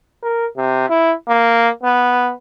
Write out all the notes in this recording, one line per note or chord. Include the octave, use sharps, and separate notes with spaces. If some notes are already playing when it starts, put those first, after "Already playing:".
A#4
C3
E4
A#3
B3